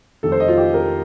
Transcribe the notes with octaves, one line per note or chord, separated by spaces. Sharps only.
F2 C3 D#3 A3 A4
C5
D#5
F4
G4
A#4